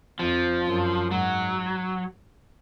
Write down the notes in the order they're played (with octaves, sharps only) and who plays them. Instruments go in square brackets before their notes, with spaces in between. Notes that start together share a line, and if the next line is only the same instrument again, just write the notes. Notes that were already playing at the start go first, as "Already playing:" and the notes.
[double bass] F2 [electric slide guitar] F3
[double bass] F#2
[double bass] G#2 [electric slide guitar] F#3